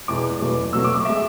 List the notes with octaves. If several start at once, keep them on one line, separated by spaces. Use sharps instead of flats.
E2 B2 G#3 D6
E2 B2 F#3 A3
B2 F#3 A3 E6
D6
D6
G#3 E5